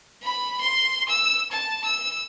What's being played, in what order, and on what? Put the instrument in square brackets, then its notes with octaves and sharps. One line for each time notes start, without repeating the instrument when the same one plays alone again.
[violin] B5
C6
E6
A5
E6